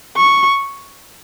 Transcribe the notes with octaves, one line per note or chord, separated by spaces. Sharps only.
C#6